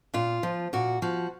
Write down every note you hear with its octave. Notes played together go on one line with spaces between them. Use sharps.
A#2 F4
F3
A#2 F#4
F3 F#4